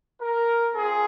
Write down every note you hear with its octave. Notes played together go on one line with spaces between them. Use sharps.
A#4
C4 F4 G#4